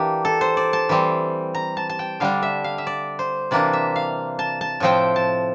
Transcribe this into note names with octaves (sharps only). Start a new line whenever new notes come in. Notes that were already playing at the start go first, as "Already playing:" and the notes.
Already playing: E3 A#3 D4 G4
A4
C5
D5
A5
E3 G3 C4
A#5
A5
A5
G5
D3 G3 D4 F5
E5
F5
E5
D5
C5
C3 E3 A#3 D4 D5
E5
F5
A5
A5
A2 F3 C4 G5
A5